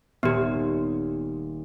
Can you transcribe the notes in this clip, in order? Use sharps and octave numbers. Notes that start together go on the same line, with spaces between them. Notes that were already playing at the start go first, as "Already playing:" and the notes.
D#1 B3 G4